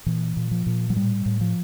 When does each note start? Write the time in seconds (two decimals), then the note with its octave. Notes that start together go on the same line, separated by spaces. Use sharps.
0.06 A#2 E3
0.37 A#2
0.51 F3
0.66 A#2
0.90 F#3
0.96 A2 G3
1.26 A2
1.41 F3